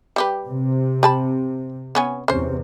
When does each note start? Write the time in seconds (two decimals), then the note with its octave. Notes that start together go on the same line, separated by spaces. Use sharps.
0.16 G3 G4 B4
0.48 C3
1.03 G4 A5 B5
1.95 B3 C#4 G#5
2.28 E2 C3 C#4 C5